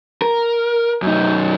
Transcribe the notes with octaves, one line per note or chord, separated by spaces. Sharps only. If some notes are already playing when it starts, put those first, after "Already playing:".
A#4
F#2 D#4